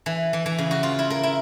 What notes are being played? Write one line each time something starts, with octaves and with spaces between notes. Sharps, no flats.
E3
E3
E3
C#3
F#4
F4
E4
A#4
E4